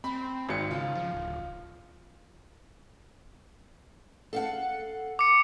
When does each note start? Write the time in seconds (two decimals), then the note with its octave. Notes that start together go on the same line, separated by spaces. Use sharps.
0.04 C4 B5
0.49 G#1 G#2 C#7
0.71 C#3 F4
0.96 F3
1.14 D1
4.33 A4 F5 F#5
5.19 D6 C#7